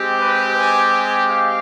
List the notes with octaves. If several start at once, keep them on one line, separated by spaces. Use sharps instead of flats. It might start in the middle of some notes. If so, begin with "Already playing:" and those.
Already playing: G#3 C4 G4
B4
G#5
G#5
F5